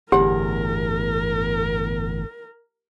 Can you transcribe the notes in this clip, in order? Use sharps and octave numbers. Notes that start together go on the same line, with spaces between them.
G1 E2 A2 G4 A#4 F#5